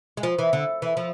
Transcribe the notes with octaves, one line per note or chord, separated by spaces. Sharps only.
G#3
F3
E3
D3
E3
F3